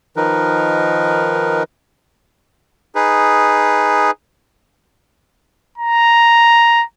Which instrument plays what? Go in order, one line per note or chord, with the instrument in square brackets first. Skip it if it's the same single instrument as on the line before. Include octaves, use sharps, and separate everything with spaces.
[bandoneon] D#3 F3 D#4 A#4 B4
[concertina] D#4 G#4 B4
[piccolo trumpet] A#5